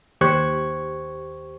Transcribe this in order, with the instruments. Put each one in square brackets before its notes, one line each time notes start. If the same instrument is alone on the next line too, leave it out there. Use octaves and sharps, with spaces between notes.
[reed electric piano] D#2 G4 C5 C#6 F#6 G#6